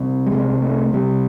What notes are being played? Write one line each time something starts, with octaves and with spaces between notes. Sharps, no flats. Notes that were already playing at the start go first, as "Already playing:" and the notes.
Already playing: C2 C3
G3
C2 C3 G#3
A3
C2 C3 G3